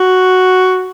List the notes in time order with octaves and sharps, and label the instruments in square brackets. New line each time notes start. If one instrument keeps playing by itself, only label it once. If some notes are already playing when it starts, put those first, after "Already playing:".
Already playing: [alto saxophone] F#4